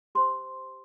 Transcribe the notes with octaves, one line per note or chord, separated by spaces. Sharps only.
G4 C5 C6